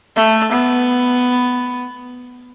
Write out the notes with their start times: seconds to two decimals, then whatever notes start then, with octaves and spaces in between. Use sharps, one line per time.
0.16 A3
0.52 B3